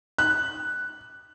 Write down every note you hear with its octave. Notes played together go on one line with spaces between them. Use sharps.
F#6